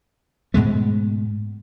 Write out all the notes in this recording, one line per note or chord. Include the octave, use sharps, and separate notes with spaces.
G#2 B2 G#3 A3